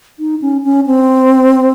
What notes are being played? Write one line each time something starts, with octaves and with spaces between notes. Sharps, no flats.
D#4
C#4
C#4
C4